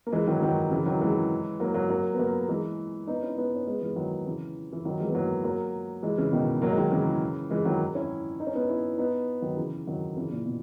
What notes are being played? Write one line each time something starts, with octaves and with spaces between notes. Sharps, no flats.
A#3
E3 G#3
D#3 F#3
D#3 F#3
C#3 E3
D#3 F#3
E3 G#3
F#3 A#3
F#3 A#3
F#3 A#3
B3
F#3 A#3
E3 G#3
B3 D#4
C#4 E4
B3 D#4
C#4
G#3 B3
E3 G#3
D#3 F#3
C#3 E3
E3
D#3 F#3
E3 G#3
B3
F#3 A#3
F#3 A#3
E3 G#3
C#3 E3
B2 D#3
F#3 A#3
G#3
D#3 F#3
C#3 E3
E3 G#3
D#3 F#3
C#4 E4
D#4
C#4
B3 D#4
C#4 E4
B3 D#4
D#3 F#3
C#3 E3
D#3 F#3
C#3 E3
A#2 C#3
B2